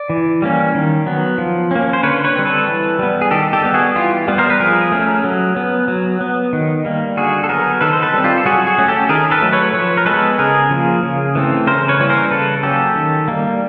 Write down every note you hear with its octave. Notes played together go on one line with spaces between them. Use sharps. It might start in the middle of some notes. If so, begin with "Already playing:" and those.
Already playing: D5
E3
G3 A#3 C#4
D#3
F#3 B3
F3
A#3 C#4
C5
D3 B4 C#5
B4 C#5
G3 C4
A4 B4
E3
G3 B3
G#4
D#3 G4 A4
G4 A4
G3 B3
F#4 G#4
E3 F4 G4
G3 B3
A#4 C5
B4
F3 G#4 A#4
A3 C#4
F#3
B3
F#3
B3
D#3
G3 A#3
D3 F#4 G#4
A4
F#3 B3 G#4 A#4
D#3 A4 B4
C5
A4 B4
G3 C4
F4 G4
A4
F#3 F#4 G#4
F#4 G#4
A3 C#4
G4 A4
D#3 G#4 A#4
A4 B4
F#3 A3
B4 C#5
F3 B4 C#5
A#4
G#3 B3 A4 B4
C#3 G#4 A#4
F3 A#3
C#3
E3 A3 C4
C#3 A#4 C5
B4 C#5
E3 G3 A#3 C#4 C#5
A#4 C5
C#3 A4 B4
F#3 A#3 C#4 G4 A4
D#3
G3 A#3